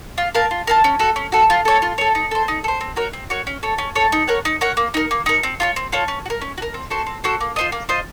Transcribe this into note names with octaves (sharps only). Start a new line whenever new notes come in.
F4
A#4 F5 A5
F4
A#4 F5 A5
C#4
F#4 A4
C#4
F#4 A4
F4
A4 C#5
F4
A4 C#5
D#4
A4 C5
D#4
A4
C5
C4
F#4 A#4 C#5
C4
F#4 A#4 C#5
C#4
A4 C#5
C#4
A4 C#5
D#4
A#4 C#5 F#5
D#4
A#4 C#5 F#5
A#3
D#4 A#4
A#3
D#4 A#4
C4
F4 A4 C#5
C4
F4 A4 C#5
C#4
F#4
A#4
C#4
F#4
A#4
C4
F#4 A4 C5
C4
F#4 A4 C5
A#3
F4 C5 D#5
A#3
F4 C5 D#5